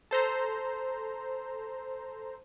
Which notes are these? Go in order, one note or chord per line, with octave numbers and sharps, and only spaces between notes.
A4 C5 A#5